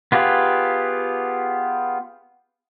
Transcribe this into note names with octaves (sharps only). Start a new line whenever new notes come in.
B3 F4 G4 G#4 B4